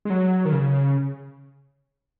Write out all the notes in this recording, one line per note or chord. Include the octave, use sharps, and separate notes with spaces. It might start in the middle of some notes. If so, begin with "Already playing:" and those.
G#3
F#3
D#3
C#3